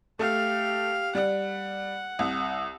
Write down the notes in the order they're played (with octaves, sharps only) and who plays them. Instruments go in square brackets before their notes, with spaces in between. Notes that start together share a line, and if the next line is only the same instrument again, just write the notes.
[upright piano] A3 [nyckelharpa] G4 F5
[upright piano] G3 [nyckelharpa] F#5
[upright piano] C2